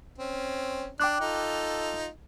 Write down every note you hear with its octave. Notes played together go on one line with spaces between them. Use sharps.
C4 C#4
D4 G5 D6 F#6
D#4 F4 A4